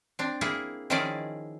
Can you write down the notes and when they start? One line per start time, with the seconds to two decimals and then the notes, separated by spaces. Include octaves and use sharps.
0.19 C4 D4
0.41 A#3 E4 G#4
0.90 D#3 F3 C#4 E4 G#4 D5